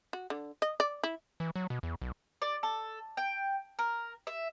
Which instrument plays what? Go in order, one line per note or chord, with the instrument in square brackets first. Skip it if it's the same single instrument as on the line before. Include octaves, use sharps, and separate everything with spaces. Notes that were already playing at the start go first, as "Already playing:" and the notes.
[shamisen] F#4
D3
D#5
D5
E4
[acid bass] E3
F#3
B2
E2
B1
[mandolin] D5
A4
G5
A#4
E5